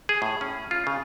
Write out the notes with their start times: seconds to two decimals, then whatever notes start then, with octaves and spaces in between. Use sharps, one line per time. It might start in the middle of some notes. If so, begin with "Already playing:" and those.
0.09 G#4
0.22 A2
0.41 C#4
0.71 F4
0.87 C#3